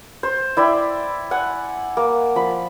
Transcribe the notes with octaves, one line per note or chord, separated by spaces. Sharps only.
C5
E4 D5 E5 G5
F#5 G#5
A#3
F3 B5